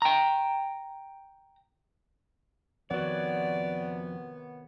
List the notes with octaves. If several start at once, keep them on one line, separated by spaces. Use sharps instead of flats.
G5 A#5
F2 C3 D#3 B3 F#4 C#5 D5 F#5